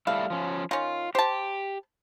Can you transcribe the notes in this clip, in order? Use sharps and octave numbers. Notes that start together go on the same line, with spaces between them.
G3 A3 E4 F5
F3 C#4
D#3 C#4 F4
G4 C5 A5